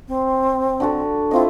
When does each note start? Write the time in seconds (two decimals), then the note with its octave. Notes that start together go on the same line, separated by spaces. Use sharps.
0.08 C4
0.80 D3 F#4 A5
1.31 C4 E4 F4 D#5